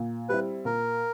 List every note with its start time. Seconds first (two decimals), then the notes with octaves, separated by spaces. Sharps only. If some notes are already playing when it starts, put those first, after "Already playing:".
Already playing: A#2
0.29 G3 C4 E4 B4
0.65 A#2 A#4